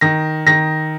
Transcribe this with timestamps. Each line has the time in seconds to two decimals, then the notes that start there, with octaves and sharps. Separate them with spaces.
0.01 D#3 A#6
0.47 D#3 A#6